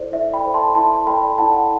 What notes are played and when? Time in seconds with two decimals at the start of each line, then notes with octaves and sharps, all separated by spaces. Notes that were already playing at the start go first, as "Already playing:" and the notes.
Already playing: E4 A4 C5 D5
0.12 E4 E5
0.33 G5 B5
0.45 A4 C5
0.54 A5 C6
0.75 E4 A5 C6
1.07 A4 D5 G5 B5
1.38 E4 F#5 A5